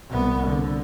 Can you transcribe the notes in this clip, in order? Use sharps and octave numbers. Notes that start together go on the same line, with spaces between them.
C2 B3
D3